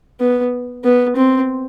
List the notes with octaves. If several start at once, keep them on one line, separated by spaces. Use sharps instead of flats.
B3
B3
C4